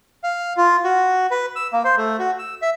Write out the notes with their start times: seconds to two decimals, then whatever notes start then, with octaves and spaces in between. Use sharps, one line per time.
0.24 F5
0.57 F4
0.84 F#4
1.31 B4
1.56 E6
1.73 A#3
1.85 C5
1.97 A3
2.19 F#4
2.39 E6
2.62 E5